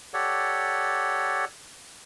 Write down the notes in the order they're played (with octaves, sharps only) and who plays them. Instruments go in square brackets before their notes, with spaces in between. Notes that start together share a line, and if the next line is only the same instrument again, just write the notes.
[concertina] G4 A4 C#5 D5 F#5